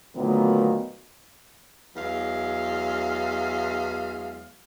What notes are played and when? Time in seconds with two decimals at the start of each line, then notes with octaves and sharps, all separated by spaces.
0.16 D2 A#2 D#3 F#3 B3
1.96 E2 F#3 G#3 F5